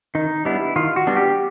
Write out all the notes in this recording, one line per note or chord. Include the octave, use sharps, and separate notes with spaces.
D#3 D#4
G3 B3 D4 E4
D#3 F4
F#4
G3 B3 D4
G4